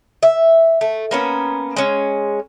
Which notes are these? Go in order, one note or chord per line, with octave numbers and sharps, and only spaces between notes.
E5
A3
A#3 B3 C#4
G#3 C#4